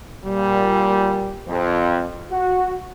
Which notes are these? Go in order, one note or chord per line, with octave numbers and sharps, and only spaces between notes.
A#2 G3
F2
F#4